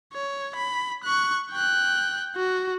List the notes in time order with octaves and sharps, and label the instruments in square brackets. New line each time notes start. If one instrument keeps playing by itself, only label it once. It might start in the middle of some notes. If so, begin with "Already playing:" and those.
[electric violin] C#5
B5
C#6 F#6
G5 F#6
F#4